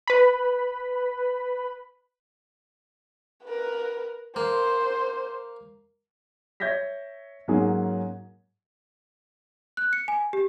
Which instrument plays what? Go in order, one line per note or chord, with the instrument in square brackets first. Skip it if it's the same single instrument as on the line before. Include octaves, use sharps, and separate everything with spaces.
[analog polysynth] B4 B5
[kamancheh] A#4 B4
[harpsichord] A#3 [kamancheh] C5
[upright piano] C#5 E5 G6 G#6 A#6 B6
G#2 F#3 A#3 C#4 G#4
[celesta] F#6
C#7
G#5
G4